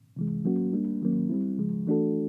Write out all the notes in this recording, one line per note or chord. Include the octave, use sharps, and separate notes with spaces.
C3 E3 G#3
F#3 A#3 C#4 F#4
G3 A#3 D4
D#3 F#3 A#3 C#4
G3 C4 E4
C#3 F3 G#3
E3 A3 D4 F#4 A4